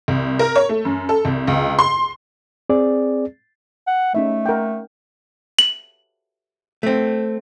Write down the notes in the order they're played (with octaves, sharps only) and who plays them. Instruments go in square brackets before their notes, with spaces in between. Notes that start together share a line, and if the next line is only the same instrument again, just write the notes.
[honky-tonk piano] C2
A#4
C#5
A3
F#2
A4
C2
C#2
C6
[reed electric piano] C4 G#4 D5
[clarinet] F#5
[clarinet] A3 [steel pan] C#4 D#4 E5
[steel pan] A#4 F#5 G5
[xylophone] F#7
[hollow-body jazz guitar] A3 C4